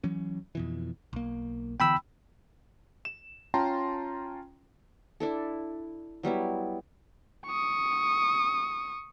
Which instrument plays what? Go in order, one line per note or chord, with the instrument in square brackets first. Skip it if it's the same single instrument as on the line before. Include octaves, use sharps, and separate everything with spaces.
[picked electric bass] E3 F#3 C#4
F2 B2 E3
B1 A#3
[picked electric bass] D3 E3 B3 [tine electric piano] G5 B5 E6
[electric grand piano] E7
C#4 F4 G5 A5 A#5 C6
[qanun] D4 E4 A4
F#3 G3 B3 E4
[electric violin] C#6 D#6